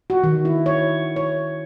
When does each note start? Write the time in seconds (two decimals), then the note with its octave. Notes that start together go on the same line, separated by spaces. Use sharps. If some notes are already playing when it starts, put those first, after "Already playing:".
0.10 F#4
0.24 D#3
0.45 E4
0.66 C#5
1.16 C#5